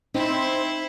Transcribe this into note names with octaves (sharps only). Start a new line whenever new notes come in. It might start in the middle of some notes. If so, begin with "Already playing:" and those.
C4 D#4 E4 C6